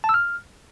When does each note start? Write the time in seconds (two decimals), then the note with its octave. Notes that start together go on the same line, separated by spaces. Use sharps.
0.04 A5
0.09 E6
0.14 F6